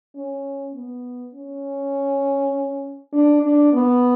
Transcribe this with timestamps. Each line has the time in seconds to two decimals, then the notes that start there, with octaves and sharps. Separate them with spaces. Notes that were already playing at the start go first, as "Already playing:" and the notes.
0.16 C#4
0.74 B3
1.34 C#4
3.13 D4
3.43 D4
3.73 B3